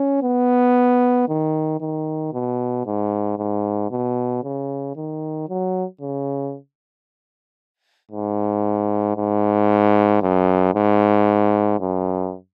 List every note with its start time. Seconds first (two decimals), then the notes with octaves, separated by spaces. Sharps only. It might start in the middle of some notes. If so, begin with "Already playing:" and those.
Already playing: C#4
0.22 B3
1.28 D#3
1.80 D#3
2.33 B2
2.86 G#2
3.38 G#2
3.91 B2
4.44 C#3
4.96 D#3
5.49 F#3
6.01 C#3
8.11 G#2
9.17 G#2
10.22 F#2
10.74 G#2
11.80 F#2